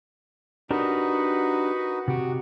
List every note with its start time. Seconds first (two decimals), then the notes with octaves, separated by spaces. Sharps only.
0.71 D4 D#4 F#4 G4 A#4 B4
2.08 C3 F#4 G4